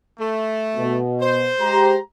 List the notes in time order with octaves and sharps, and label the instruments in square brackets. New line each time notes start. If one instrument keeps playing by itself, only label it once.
[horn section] A3
[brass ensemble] B2
[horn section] C5
[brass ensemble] G#3 G4 A#5